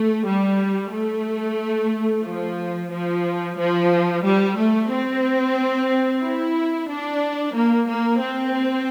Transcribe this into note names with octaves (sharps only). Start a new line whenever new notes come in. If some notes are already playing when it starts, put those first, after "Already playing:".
Already playing: A3
G3
A3
F3
F3
F3
G3
A3
C4
E4
D4
A#3
A#3
C4